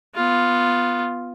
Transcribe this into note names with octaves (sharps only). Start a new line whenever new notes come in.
B3 F4